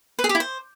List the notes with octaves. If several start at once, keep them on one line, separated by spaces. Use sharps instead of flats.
B4
G#4
G4
E4
C5